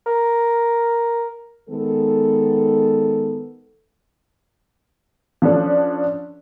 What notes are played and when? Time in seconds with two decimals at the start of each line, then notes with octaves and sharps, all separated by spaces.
0.06 A#4
1.69 D#3 G#3 B3 A4
5.42 F3 C#4 D4 A4